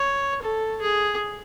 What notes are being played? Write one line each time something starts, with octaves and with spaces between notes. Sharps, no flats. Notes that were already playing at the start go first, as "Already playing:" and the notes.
Already playing: C#5
A4
G#4